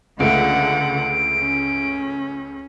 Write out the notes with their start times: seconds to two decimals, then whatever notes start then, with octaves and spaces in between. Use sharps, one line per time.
0.20 C#2 D3 A3 F#5 D7
1.39 C#4